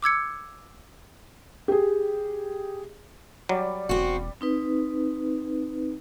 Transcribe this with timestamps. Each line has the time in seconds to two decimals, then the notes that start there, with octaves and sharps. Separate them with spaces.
0.02 D6 E6 G#6 C#7
1.68 G4 G#4
3.49 F#3 G3 D5
3.89 E1 C4 F#4
4.41 C4 D#4 B4